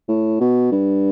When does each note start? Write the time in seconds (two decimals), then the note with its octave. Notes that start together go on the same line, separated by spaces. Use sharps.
0.08 A2
0.41 B2
0.72 G2